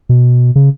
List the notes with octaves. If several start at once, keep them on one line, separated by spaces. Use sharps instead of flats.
B2
C#3